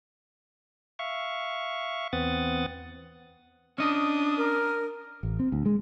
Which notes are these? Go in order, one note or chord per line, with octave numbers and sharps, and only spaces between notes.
E5 F5 C#6
E2 B3 C4 F#5 D#6 A6
C#4 D4 D#5 D#6
A#4
A1
C4
D2
G#3